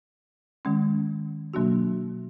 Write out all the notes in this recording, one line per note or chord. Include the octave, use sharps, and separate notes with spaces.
D#3 G#3 C#4
B2 F#3 A#3 D4 F#4